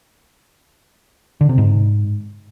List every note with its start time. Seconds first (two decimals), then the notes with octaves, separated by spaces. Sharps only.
1.41 D3
1.49 C3
1.58 G#2